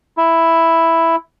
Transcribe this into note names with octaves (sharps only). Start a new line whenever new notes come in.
E4